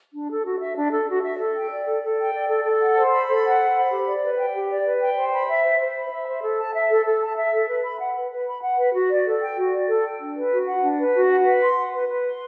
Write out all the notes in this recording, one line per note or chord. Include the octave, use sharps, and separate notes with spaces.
D4
A4
F#4
E5
D4
A4
F#4
E5
A4
G5
D5
A4
A4
G5
D5
A4
A4
F#5
C5
B5
A4
F#5
C5
B5
G4
D5
B4
G5
G4
D5
B4
G5
C5
B5
E5
C5
C5
B5
E5
C5
A4
A5
E5
A4
A4
A5
E5
A4
B4
B5
F#5
B4
B4
B5
F#5
B4
F#4
D5
A4
G5
F#4
D5
A4
G5
D4
B4
F#4
F#5
D4
B4
F#4
F#5
B4
C6
F#5
B4
B4
C6